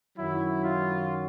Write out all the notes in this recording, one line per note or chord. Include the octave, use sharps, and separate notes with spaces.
F#2 D#3 F#3 E4
F4